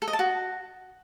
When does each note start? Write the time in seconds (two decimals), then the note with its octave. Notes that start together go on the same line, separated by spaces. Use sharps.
0.02 A4
0.08 D#5
0.13 A5
0.19 F#4